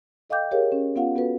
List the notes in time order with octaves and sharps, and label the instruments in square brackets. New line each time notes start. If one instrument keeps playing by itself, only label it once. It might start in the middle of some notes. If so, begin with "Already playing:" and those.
[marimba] A4 D#5 F5 G5 D6 G6
G4 G#4 A#4 C#5 F5
C#4
B3 C#4 F4 F5 F#5
B3 F#4 A4 B4